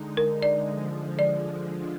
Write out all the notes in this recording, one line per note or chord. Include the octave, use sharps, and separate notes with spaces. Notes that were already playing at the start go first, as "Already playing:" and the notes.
Already playing: D3 G#3 D#4
A#4
D5
D3 F3 G#3
D5